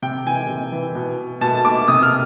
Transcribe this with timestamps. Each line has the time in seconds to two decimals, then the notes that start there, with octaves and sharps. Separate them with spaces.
0.02 C3 G5
0.27 E3 G#5
0.49 C3
0.72 E3
0.95 B2
1.41 B2 A5
1.65 D6
1.88 C3 D#6
2.03 F6